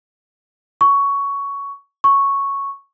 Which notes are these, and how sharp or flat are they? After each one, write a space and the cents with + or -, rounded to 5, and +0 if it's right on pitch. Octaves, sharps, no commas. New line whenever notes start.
C#6 +10
C#6 -5